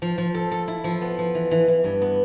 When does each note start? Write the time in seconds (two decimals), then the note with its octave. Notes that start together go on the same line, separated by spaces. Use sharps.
0.02 F3
0.18 F3
0.34 A4
0.52 A4
0.68 E4
0.84 F3
1.02 B3
1.18 F3
1.35 E3
1.51 E3
1.68 E3
1.84 G2
2.02 B3